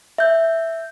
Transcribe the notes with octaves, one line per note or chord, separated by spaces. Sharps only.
E5 G6